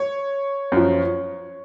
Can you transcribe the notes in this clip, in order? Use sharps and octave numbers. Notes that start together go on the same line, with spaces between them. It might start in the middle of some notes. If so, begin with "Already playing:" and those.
Already playing: C#5
F#2 F3